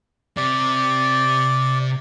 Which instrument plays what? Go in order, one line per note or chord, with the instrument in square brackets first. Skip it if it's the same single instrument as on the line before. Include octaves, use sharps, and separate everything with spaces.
[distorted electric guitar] C3 [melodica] D5